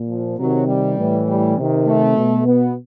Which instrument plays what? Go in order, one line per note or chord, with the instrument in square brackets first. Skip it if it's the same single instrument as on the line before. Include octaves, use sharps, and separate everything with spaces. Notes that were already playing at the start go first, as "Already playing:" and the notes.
Already playing: [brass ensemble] A#2
F3
C3 D#3 F#3
G3
A2 E3
G3
C3 D#3
A3
B2
B3